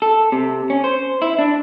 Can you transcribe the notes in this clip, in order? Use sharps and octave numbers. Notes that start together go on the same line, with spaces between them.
A4
C3
C#4
C5
E4
D4